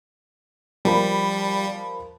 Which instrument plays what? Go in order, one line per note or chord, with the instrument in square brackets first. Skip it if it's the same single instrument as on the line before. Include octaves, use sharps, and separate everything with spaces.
[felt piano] F3 A#4 B5 [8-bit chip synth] G3